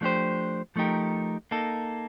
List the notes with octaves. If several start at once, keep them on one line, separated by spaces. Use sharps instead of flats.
F3 A3 D4 G4 C5
F3 A3 D#4 G4 A#4
A#3 D#4 A4